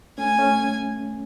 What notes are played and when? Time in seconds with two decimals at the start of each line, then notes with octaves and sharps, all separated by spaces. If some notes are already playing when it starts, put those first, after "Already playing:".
0.18 A3 C#4 G#5
0.39 A3 C#4